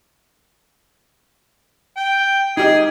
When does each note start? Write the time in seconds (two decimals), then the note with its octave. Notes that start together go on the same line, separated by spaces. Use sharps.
1.97 G5
2.57 D#4 G4 G#4 D#5